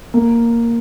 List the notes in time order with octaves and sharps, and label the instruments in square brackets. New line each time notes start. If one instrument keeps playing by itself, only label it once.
[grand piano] A#3